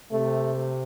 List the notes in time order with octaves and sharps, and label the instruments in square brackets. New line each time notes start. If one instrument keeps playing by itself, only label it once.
[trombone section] C3 [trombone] A3